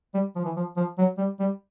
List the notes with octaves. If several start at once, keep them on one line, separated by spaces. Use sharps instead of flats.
G3
F3
E3
F3
F3
F#3
G3
G3